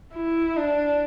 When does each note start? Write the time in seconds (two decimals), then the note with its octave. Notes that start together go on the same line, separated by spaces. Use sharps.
0.14 E4
0.57 D4